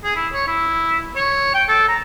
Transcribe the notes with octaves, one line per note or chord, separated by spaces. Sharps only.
G#4
E4
C#5
E4
C#5
G5
A4
A#5